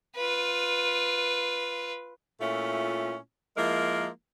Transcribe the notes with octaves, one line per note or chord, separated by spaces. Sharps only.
F4 B4
A#2 A3 C#4 E4 F4
F3 G#3 A#3 E4 A#4